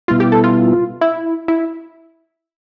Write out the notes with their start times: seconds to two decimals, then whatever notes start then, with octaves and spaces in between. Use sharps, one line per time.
0.08 B2 G3 B3 E4 F4
0.20 G4
0.32 A4
0.44 F4
1.01 E4
1.48 E4